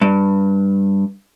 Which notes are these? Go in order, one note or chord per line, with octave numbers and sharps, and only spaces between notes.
G2